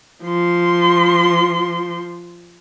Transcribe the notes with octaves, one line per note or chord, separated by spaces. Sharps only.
F3 C6